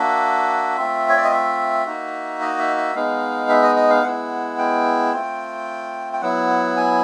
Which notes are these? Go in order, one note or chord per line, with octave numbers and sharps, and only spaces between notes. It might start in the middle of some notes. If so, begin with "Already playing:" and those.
Already playing: A#3 D4 F#4 E5
A3 C4 F4
C#5
D5
D#5
E5
A#3 D#4 F#4
D#5
E5
E5
G#3 B3 D#4 F5
E5
D#5
D#5
F5
G#3 B3 E4 F#5
G5
A3 C4 F4
G5
F#3 B3 E4 F#5
G#5